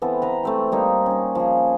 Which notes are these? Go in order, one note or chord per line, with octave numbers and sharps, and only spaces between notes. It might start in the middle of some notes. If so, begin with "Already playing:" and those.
E3 B3 C4 A4
B4 A#5
A3 C4 G4
G3 A#3 D#4
C#4 D#4
F3 G#4